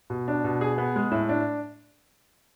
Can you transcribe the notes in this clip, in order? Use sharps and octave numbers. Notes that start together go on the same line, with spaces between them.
B2
D4
B2
G#4
B3
G#3
A2
D4